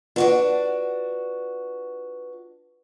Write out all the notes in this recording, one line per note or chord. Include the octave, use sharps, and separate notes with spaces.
D4 F4 F#4 B4 D5 F#5